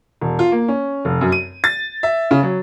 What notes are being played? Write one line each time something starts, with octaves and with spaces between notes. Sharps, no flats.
E1
F4
A#3
C#4
F1
F#2
D#7
A6
E5
C#3
F#3